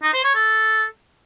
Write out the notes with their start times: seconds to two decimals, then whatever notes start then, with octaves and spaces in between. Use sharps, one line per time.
0.03 D#4
0.13 C5
0.24 C#5
0.35 A4